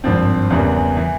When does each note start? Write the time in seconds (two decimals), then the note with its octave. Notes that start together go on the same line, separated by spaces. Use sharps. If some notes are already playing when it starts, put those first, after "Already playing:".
0.04 G#1 G2 F3 C4
0.50 E2 C#3 E3 G3 A#3
0.97 E3